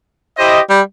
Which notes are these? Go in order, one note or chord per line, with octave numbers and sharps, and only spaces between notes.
E4 G4 C5 D#5
G3